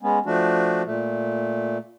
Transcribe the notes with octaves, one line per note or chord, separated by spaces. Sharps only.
G#3 B3 C#4
F3 A3 D4 F#4
A#2 A3